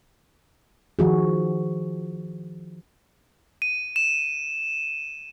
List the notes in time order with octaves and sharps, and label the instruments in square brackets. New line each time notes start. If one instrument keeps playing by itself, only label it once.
[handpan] D#3 F3 F#4 G#4
[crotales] D#7
E7